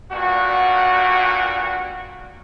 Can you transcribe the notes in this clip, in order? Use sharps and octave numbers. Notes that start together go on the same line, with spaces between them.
G2 A#2 F#4